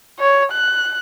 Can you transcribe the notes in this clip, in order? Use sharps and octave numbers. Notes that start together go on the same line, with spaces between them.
C#5
F#6